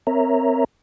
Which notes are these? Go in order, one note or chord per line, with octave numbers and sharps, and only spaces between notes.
C4 A#4 C#5 E5 A#5